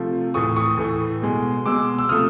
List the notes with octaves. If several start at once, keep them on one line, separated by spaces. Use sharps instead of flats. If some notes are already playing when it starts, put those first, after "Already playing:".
Already playing: C3 F3 A3
A2 E3 A3 C#6 D#6
C#6 D#6
A2 E3 A3
B2 G#3
B2 G#3 D6 E6
E6
C3 F3 A3 D#6 F6